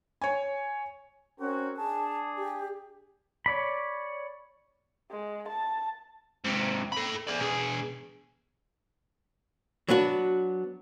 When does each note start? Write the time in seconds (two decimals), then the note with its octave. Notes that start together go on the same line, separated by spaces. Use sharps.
0.22 C#5 G#5
1.39 C4 C#4 F#4 A#4
1.77 D4 G#4 A5
2.37 G4
3.46 C#5 D5 B5
5.11 G#3
5.48 A5
6.45 G#2 C3
6.92 A4 B5
7.27 G#4 D5
7.40 B2 G#4
9.89 F#3 B3 D4 F#4